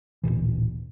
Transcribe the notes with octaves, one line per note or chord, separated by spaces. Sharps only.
D1 A1 A#2 E3